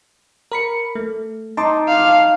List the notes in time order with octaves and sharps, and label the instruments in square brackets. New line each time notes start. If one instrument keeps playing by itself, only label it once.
[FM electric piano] A#4 B5 C#7
A3
[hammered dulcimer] D#4 [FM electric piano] A5 C6 D6
[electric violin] F5